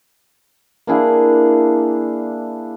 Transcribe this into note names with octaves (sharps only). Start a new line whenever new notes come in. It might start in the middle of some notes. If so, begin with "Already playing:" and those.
A#3 D4 E4 G#4